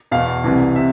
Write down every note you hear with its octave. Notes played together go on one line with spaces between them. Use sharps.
E2 B2 F5
C2 C3 E3
C3 E5